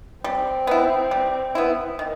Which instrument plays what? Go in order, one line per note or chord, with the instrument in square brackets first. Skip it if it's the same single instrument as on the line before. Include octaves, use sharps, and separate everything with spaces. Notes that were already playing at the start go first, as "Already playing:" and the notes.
[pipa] G3 [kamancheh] C4
[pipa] B3 E4
G3
B3 E4
D#3